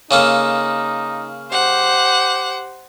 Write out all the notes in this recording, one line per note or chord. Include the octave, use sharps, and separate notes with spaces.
C#3 A#3 D#4 A4
G4 C5 F#5